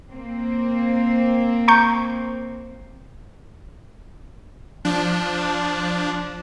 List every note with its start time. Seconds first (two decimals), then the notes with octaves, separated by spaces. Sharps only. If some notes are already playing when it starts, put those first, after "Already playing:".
0.11 A#3 C4
1.68 A#5 C#6 G6
4.85 F3 D4